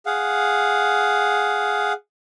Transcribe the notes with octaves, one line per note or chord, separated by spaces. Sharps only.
G#4 F5 F#5